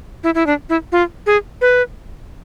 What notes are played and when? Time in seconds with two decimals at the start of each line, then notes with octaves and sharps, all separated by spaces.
0.24 E4
0.35 E4
0.47 D4
0.69 E4
0.92 F4
1.26 G#4
1.61 B4